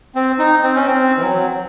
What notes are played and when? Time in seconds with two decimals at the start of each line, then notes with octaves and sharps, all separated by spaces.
0.15 C4
0.39 D#4
0.63 C4
0.75 C#4
0.87 C4
1.18 E3
1.22 F#3